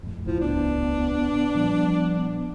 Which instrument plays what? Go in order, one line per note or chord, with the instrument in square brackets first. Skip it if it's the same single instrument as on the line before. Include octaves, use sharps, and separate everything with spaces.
[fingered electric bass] F2 A2
[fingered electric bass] D#1 C#2 A2 [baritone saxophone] F3 [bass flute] E4
[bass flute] B3 [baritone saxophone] D4
[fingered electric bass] A#2 F3 G3